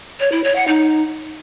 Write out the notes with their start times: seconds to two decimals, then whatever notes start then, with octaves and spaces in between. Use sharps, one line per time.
0.20 C#5
0.32 E4
0.44 C#5
0.56 F#5
0.68 D#4